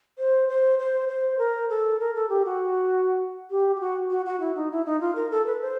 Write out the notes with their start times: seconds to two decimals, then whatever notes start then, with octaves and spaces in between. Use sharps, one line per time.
0.19 C5
0.49 C5
0.79 C5
1.09 C5
1.39 A#4
1.70 A4
2.00 A#4
2.15 A4
2.30 G4
2.45 F#4
3.51 G4
3.76 G4
3.80 F#4
4.10 F#4
4.26 F#4
4.40 E4
4.56 D#4
4.71 E4
4.86 D#4
5.01 F4
5.16 A#4
5.31 A4
5.46 B4
5.62 C5